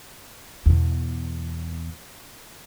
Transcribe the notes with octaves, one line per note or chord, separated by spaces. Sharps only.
E2 B2